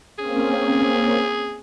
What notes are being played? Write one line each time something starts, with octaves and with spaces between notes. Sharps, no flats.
A#3 C4 C#4 G#4